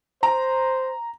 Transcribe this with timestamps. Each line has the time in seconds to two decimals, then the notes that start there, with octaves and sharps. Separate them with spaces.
0.23 C5 A#5